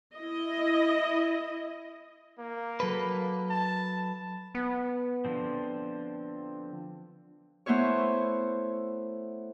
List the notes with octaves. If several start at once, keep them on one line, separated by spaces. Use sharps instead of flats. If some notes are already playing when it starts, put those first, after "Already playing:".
E4 D#5
A#3
F#3 A4 B4
A5
B3
D3 F3 C4
A3 B3 E4 C5 C#5